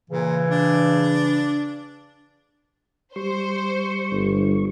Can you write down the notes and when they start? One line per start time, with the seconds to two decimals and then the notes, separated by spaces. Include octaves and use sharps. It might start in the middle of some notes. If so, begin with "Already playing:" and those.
0.10 A#2 C#3 E3
0.51 D4
3.16 G3 C5 C#6
4.11 G1